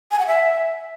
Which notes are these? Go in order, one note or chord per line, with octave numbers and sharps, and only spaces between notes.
G#5
F#5
E5